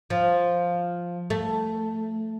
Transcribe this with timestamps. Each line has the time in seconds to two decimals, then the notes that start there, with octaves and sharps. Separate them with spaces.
0.10 F3
1.30 A3